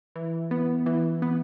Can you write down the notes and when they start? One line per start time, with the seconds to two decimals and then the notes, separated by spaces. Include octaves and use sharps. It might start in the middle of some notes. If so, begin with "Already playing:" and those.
0.16 E3
0.51 B3
0.86 E3
1.22 B3